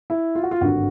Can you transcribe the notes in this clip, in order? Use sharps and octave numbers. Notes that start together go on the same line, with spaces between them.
E4
F4
F#4
F4
G#1 G2 D3 F#4